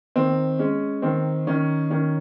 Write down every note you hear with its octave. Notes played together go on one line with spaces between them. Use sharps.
D#3 C4
G#3 C#4
D#3 C4
D#3 C#4
D#3 C#4